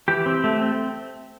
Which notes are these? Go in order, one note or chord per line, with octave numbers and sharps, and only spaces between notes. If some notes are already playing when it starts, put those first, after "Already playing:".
E3 G4
C4
A3
C4